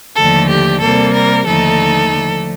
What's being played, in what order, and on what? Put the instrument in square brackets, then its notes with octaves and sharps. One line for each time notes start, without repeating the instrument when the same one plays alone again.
[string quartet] D#2 D3 F3 A3 A4
G4
C3 G3 A#3 A4
A#4
D#2 D3 F3 A3 D#4 A4
D3 F3 A3